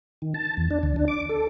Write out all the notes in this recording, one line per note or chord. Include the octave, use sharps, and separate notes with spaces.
D#3
A5
E2
D4
D2
D4
D6
A4